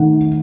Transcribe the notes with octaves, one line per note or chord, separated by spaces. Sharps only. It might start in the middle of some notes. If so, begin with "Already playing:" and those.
Already playing: D#3 A3 F#5